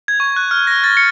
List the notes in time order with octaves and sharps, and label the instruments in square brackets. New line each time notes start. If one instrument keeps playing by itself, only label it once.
[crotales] G#6
C#6
F#6
F6
A#6
A6
C#7